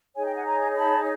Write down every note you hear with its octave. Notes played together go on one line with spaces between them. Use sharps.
D#4 G#4 C#5 G#5
G5
F#5 G#5
G#5 A#5
A5 B5